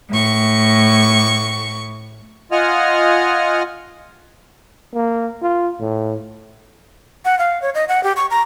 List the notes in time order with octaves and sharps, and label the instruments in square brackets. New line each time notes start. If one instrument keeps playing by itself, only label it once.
[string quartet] A2 C#6
[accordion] F4 D#5 F#5 G#5 F6
[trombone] A#3
F4
A2
[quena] F#5
F5
C#5
D#5
F#5
G4
C#6
A#5